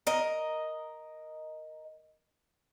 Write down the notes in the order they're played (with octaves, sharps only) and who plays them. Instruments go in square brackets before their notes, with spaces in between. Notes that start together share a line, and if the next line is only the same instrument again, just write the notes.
[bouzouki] A#4 D#5